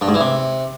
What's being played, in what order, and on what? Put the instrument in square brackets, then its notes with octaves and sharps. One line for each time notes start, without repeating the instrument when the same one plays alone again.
[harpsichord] G2
G#2
E3
C3